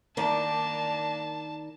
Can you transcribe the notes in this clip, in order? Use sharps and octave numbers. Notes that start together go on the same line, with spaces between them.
D#3 A#3 D4 D5 A5